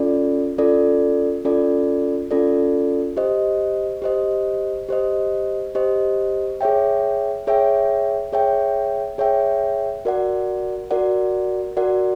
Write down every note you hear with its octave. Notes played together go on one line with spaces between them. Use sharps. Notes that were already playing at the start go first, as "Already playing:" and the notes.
Already playing: C#4 F4 A4 D5
C#4 F4 A4 D5
C#4 F4 A4 D5
C#4 F4 A4 D5
G4 C5 D#5
G4 C5 D#5
G4 C5 D#5
G4 C5 D#5
G#4 C#5 E5 G5
G#4 C#5 E5 G5
G#4 C#5 E5 G5
G#4 C#5 E5 G5
F#4 A#4 D5 F#5
F#4 A#4 D5 F#5
F#4 A#4 D5 F#5